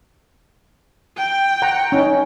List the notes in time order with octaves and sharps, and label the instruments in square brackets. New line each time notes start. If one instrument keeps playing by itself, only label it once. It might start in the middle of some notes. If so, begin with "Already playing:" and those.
[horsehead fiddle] G5
[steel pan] F#5 A#5
C#4 D#4